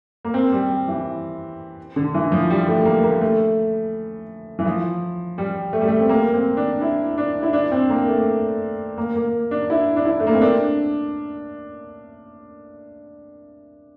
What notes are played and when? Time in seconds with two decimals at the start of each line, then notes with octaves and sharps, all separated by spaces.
0.25 A#3
0.34 C4
0.52 G3
0.70 G3
0.88 E3
1.96 D3
2.14 E3
2.32 F3
2.50 G3
2.68 A3
2.85 A#3
3.04 A#3
3.21 A3
4.59 E3
4.66 F3
5.38 G3
5.73 A3
5.81 G3
5.88 A3
6.00 C4
6.09 A#3
6.34 C4
6.57 D4
6.81 E4
7.18 D4
7.43 E4
7.53 D4
7.72 C4
7.90 A#3
8.07 A3
8.98 A#3
9.16 A#3
9.51 D4
9.70 E4
9.96 D4
10.05 E4
10.20 A3
10.27 A#3
10.34 C4
10.41 D4